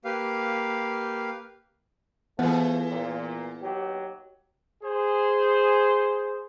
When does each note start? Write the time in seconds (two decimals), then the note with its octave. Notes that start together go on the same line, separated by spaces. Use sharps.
0.05 A#3 G4 B4 F5
2.39 E3 F3 A3 B3 G#4
2.90 A#2
3.62 D#2 F#3 G4
4.83 G#4 C5